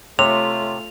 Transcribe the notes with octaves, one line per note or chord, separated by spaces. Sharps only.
C3 A3 F4 C#5 F7